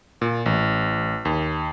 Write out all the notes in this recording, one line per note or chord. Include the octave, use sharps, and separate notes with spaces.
A#2
A1
D#2